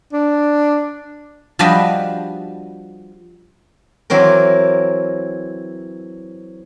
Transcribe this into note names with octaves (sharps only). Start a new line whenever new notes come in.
D4
F3 G3 D4 F#4 B4 D#5
E3 F#3 C4 A#4